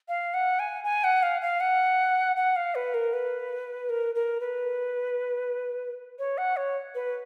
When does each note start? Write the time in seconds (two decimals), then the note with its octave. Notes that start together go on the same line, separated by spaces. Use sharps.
0.08 F5
0.34 F#5
0.59 G#5
0.84 G#5
1.04 F#5
1.23 F5
1.42 F5
1.60 F#5
2.37 F#5
2.56 F5
2.75 B4
2.94 A#4
3.13 B4
3.89 A#4
4.15 A#4
4.41 B4
6.19 C#5
6.38 F#5
6.57 C#5
6.95 B4